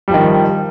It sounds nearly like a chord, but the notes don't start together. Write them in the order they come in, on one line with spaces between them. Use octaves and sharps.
G3 F3 D#3